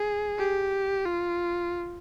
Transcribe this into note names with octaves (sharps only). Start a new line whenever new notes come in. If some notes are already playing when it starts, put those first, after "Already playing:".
Already playing: G#4
G4
F4